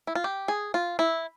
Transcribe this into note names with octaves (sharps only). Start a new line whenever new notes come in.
E4
F4
G4
G#4
F4
E4